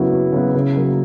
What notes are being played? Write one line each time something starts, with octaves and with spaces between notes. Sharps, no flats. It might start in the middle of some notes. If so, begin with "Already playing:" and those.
Already playing: F#2 C#3 F#3 B3 E4 F#4
F#2
C#3 F#3 B3
C#3
F#3 A#3